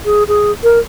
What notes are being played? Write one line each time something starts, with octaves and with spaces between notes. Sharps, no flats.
G#4
G#4
A#4